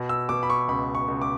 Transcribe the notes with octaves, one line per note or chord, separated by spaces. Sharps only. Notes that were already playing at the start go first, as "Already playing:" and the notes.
Already playing: B2
E6
B2 D6
B5
C#6
C#2 B5
C#6
C#2
D6